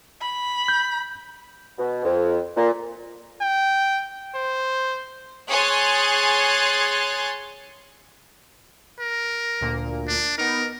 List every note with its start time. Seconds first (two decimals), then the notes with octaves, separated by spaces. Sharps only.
0.22 B5
0.68 G6
1.78 B2
2.05 F2
2.57 A#2
3.41 G5
4.34 C5
5.49 G#4 C#5 G#5 C6 F#6 A6
8.99 A#4
9.61 D2 A#2 A#3
10.08 D4
10.38 B3 D#4 A#4